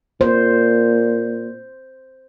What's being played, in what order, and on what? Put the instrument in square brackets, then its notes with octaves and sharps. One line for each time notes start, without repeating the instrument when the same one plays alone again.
[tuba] A#2 [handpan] C5